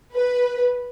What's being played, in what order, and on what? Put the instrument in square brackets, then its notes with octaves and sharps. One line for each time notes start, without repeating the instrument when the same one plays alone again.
[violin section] B4